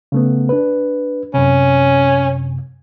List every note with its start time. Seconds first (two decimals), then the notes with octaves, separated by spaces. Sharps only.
0.12 C#3 A3 B3
0.49 D4 B4
1.34 F#2 C3 C#4